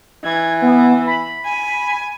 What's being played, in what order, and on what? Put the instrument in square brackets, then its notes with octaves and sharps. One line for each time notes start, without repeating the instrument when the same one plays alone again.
[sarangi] E3 [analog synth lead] G#6
[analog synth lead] B3
B5
[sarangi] G#5